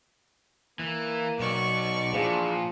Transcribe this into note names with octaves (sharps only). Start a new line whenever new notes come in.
E3 A#3
B1 B2 D5 C#6
A#2 E3 F3 D4 G#4